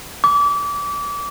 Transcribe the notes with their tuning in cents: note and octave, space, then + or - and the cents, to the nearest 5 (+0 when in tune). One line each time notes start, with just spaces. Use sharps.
D6 -30